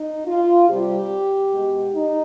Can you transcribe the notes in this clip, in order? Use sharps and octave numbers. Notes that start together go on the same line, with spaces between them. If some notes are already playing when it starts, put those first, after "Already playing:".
Already playing: D#4
F4
C3 G3 G4
B2 G#3
D#4